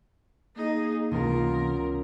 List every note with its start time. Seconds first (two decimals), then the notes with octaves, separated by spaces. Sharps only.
0.56 A#3 D#4 G#4
1.11 C#2 C3 E3 B3 F4 A#4